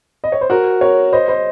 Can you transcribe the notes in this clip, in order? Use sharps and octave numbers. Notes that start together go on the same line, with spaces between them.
D#5
C#5
C5
F#4 A#4
A#4 C#5
C5 D#5
C5 D#5